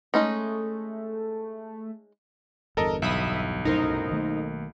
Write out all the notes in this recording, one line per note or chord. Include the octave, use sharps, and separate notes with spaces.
G#3 A3 C#4 D#4
G1 E2 G2 A4 A#4 D#5
B1 E5 B5 D#6
C2 F#2 A2 D#4 A#4 C5
D#3 A3 A#3